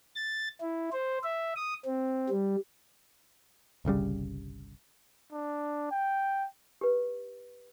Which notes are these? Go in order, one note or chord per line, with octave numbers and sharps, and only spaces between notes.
A6
E4
C5
E5
D#6
C4
G3
G1 C2 C#3 G3
D4
G5
G4 B4